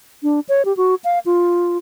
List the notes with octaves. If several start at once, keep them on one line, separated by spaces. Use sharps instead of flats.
D4
C#5
G4
F#4
F5
F4